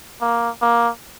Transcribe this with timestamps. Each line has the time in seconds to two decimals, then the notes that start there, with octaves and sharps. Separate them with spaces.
0.21 A#3
0.62 A#3